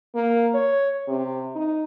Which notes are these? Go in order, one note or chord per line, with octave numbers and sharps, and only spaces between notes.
A#3
C#5
C3
D#4